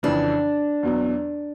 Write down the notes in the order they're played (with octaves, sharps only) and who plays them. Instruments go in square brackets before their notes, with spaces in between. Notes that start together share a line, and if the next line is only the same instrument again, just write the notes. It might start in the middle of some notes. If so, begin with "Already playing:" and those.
[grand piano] F2 C#3 E3 [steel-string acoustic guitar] D4
[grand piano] E2 B2 F#3